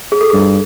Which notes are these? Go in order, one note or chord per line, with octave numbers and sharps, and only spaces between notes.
G#4
A4
G2 G#4